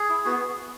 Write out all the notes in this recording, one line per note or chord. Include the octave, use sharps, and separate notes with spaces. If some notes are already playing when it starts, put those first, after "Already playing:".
Already playing: G#4
E4
B3 F#4